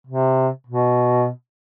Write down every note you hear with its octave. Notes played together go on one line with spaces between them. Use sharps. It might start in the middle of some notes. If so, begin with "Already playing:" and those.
C3
B2